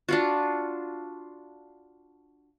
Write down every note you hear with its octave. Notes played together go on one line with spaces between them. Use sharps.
D4 F4 F#4